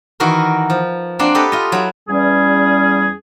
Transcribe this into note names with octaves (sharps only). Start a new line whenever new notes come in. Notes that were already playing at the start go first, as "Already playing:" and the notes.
D#3 E3 F#4 A#4 B4
F3
A#3 C4 D4 D5 F#5 C6
G4 A4 B4 D#5
F4 D#5
F#3 E4
E2 G3 C#4 G#4